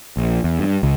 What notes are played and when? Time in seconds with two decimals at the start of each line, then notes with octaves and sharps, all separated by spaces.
0.17 A#1
0.44 E2
0.59 G2
0.83 C#2